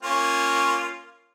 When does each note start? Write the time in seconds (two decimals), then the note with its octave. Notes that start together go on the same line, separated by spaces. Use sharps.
0.03 A#3 C#4 F4